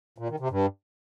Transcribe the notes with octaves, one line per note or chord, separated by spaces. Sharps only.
A#2
D#3
C3
G2